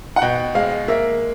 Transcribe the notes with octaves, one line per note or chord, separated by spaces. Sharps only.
F#5
B2 G5
G#3 F5
A#3 E5